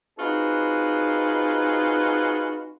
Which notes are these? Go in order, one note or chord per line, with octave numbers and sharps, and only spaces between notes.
C4 D#4 F4 F#4 G#4 B4